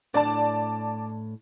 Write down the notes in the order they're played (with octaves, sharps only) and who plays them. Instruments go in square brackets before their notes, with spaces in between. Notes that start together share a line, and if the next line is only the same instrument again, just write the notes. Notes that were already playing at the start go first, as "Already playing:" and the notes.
[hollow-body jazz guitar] A2 D4 [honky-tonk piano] D5 A5